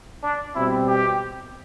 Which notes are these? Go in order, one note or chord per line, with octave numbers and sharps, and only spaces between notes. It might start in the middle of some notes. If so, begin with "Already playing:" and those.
D4
B2 G3 C4 E4
G4